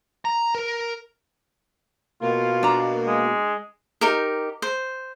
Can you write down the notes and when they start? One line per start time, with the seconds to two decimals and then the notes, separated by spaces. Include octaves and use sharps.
0.25 A#5
0.55 A#4
2.22 B2 A#3 F4
2.63 D4 A#5
3.07 G#3
4.01 D#4 G4 A#4
4.62 C5